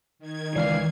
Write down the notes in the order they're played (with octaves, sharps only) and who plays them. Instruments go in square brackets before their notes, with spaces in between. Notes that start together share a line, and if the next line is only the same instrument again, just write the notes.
[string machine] D#3 G#6
[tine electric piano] C#2 F5 C7 [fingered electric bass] E3 [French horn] D5